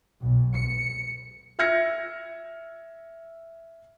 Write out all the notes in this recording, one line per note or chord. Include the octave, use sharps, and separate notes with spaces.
B1
C#7
E5 E6 F6 G#6 A#6 C#7